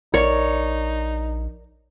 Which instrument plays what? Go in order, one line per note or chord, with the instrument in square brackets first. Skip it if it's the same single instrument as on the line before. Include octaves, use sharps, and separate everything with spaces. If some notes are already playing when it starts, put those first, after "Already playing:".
[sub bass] A#1 [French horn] D#4 [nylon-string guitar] A#4 D5 [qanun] C#5